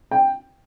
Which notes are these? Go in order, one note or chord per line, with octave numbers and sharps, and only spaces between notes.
G5